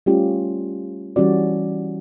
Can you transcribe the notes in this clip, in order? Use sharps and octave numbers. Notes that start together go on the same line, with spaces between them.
G3 A3 C#4 F4 G4
E3 G3 C#4 F#4 D5